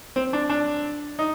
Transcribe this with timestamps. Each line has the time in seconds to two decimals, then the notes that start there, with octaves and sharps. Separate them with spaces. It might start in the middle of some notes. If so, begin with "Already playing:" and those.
0.16 C4
0.33 D4
0.50 D4
1.19 D#4